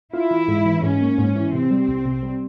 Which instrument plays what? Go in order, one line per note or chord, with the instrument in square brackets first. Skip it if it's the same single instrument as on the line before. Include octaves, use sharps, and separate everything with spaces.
[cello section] E4 [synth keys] F4
[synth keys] E3
G#2
E3
[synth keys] G#2 [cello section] C#4
[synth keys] A#3
G#2
E3
[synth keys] C3 [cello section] C4
[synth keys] G3
C2
C3
G3